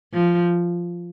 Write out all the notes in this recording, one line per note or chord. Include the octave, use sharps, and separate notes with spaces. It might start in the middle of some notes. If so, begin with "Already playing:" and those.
F3